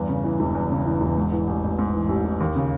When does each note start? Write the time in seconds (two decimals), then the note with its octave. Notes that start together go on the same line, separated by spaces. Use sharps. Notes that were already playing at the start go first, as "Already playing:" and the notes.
Already playing: E2 G2
0.09 C#3
0.24 E3
0.40 E1
0.55 E2
0.71 C#3
0.85 E3
1.01 E1
1.17 G#2
1.32 E3
1.47 A1
1.64 A1
1.79 G#2
1.94 E3
2.09 A1
2.25 A1
2.40 D#2
2.56 C#3